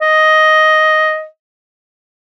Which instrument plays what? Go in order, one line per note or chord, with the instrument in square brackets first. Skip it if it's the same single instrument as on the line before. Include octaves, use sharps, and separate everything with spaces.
[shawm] D#5